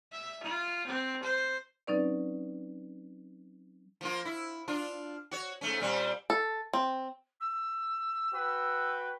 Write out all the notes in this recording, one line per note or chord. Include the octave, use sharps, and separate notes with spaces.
E5
F4
C4
C5
F#3 C4 C#4 D#4 B4 D5
F3 A#3 F4
E4
D4 F4
F#4 C#5
G#2 A3 C#4
A#2 G3 C4
A4
C4
E6
F#4 B4 G5